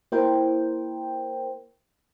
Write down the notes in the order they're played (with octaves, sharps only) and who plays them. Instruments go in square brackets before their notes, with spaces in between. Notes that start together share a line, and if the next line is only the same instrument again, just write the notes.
[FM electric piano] A#3 E4 A#4 C5 G5